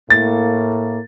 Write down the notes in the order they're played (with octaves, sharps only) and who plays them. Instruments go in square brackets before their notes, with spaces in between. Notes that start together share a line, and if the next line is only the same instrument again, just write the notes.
[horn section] A2 A#3 [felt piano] A6